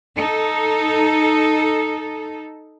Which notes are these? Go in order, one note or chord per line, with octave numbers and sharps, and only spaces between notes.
D#4 A4